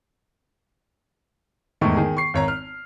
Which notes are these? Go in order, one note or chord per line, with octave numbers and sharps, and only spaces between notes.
E1 G#2 D#3 A3 C#6
D#3 G#4
C#6 C7
G#1 C#5 A#5
F6